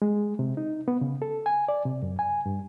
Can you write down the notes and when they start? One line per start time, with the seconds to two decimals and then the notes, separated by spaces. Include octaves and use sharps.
0.02 G#3
0.39 C3
0.57 D#4
0.88 B3
1.01 C#3
1.22 A4
1.46 G#5
1.68 D5
1.85 C3
2.03 F#2
2.19 G#5
2.46 G2